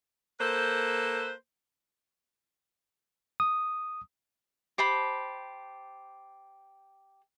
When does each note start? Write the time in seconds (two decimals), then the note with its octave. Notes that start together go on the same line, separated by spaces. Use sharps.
0.40 A#3 A4 B4 C5
3.40 D#6
4.78 G4 C5 A5 B5